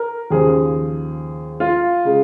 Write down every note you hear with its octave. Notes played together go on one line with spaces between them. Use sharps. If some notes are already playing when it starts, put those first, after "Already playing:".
Already playing: A#4
D#2 C#3 F3 G#4
F4
C#3 G#3